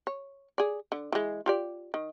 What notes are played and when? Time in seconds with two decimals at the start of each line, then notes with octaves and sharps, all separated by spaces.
0.07 C#5
0.58 G#4 D5
0.92 D3
1.12 E3 G#3
1.46 F4 G4 D5
1.94 D#3